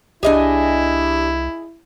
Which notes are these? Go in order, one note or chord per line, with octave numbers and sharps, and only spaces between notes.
C2 D4 E4 G4 G#4 D#5 G#5